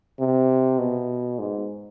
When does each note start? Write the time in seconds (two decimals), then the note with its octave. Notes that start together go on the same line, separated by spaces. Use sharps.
0.19 C3
0.79 B2
1.39 G#2